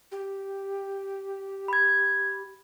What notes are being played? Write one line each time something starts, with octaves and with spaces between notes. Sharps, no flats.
G4
B5 G#6